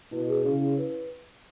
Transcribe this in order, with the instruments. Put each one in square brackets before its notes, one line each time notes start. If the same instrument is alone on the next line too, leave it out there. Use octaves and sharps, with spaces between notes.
[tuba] B2 [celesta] E4
[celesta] G#4
[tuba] C#3 [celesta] E4
[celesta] E4
B4